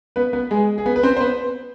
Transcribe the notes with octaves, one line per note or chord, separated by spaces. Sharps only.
B3 B4
B3 B4
G#3 G#4
G#4
B3 B4
B4
C4 C5
C5
B3 B4